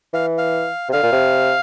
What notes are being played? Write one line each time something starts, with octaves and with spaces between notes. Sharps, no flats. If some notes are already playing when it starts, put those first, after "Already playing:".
E3 F5
F5
C3
D3 F5
A#2
C3